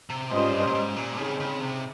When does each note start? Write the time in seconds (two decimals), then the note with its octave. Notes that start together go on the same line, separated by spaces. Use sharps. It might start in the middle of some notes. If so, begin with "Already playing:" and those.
0.10 C3
0.31 G#2 G3 C#4 F4 C5 D#5
0.53 G2
0.67 A#2
0.74 G#2
0.96 A#2
1.17 C#3 C4 D#4 G#4
1.40 C#3
1.61 C3